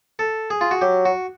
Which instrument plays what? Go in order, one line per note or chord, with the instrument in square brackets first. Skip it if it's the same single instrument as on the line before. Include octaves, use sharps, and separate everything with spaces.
[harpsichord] A4
G#4
F4
F#4
[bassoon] F#3 [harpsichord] G4
[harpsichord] F#4